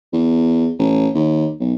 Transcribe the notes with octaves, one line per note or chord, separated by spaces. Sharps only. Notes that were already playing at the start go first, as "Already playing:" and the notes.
E2
A1
D#2
B1